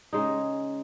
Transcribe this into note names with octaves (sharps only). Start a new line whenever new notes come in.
C#3 G#3 D#4